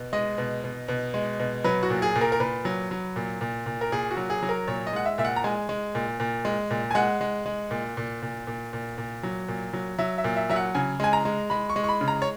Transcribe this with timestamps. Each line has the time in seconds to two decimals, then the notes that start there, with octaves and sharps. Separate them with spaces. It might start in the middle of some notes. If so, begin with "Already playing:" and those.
Already playing: B2
0.13 G#3 D#5
0.38 B2
0.64 B2
0.88 B2
1.14 G#3
1.40 B2
1.64 F#3 B4
1.83 F#4
1.90 A#2
2.02 G#4
2.15 A#2
2.21 A#4
2.32 A#4
2.40 A#2 B4
2.65 F#3
2.91 F#3
3.16 A#2
3.41 A#2
3.66 A#2
3.81 A#4
3.92 A#2 G#4
4.11 F#4
4.17 F#3
4.30 G#4
4.43 F#3
4.49 A#4
4.68 A#2 C#5
4.87 D#5
4.93 G#3 F#5
5.05 E5
5.18 A#2 E5
5.25 F#5
5.36 A#5
5.44 G#3 G#5
5.69 G#3
5.95 A#2
6.20 A#2
6.45 G#3
6.70 A#2
6.91 G#5
6.95 G#3 F#5
7.21 G#3
7.46 G#3
7.71 A#2
7.97 A#2
8.22 A#2
8.47 A#2
8.73 A#2
8.98 A#2
9.23 F#3
9.48 A#2
9.73 F#3
9.99 F#3 E5
10.18 E5
10.24 A#2
10.36 E5
10.50 F#3 E5
10.56 F#5
10.75 C#3 G#5
11.00 G#3 G#5
11.13 A#5
11.25 G#3
11.50 G#3 B5
11.70 C#6
11.76 G#3
11.84 C#6
11.89 B5
12.01 C#3
12.08 A#5
12.22 C#5